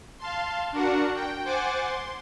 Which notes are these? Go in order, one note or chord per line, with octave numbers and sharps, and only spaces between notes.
F5 A5 C6
D4 F#4 A#4 F#5
G5
C5 F#5 G#5 D6 A6
C6